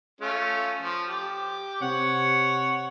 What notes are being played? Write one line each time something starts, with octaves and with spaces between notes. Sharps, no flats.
A3 C#4 F4
F3
G4
C3 C#5 F#5